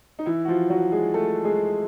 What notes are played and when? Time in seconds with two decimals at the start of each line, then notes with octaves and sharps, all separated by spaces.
0.19 D#4
0.26 E3 E4
0.45 F#4
0.48 F3 F4
0.70 F#3 F#4
0.92 G#3 G#4
1.14 A3 A4
1.45 G#3 G#4